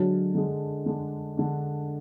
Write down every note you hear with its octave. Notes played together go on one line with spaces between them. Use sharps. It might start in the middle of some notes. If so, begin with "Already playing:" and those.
Already playing: D3 F#3 G#3 D4
D3 G#3 D4
D3 G#3 D4
D3 G#3 D4